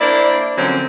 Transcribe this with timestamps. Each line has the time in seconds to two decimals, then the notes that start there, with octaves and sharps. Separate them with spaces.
0.01 A#3 D4 E4 C5 D5
0.58 D3 F3 F#3 C4 C#4